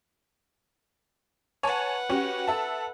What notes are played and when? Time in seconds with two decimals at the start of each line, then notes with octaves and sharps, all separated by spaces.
1.63 B4 C#5 F#5 G#5 A5
2.09 C#4 F#4 G4
2.47 A4 E5 A5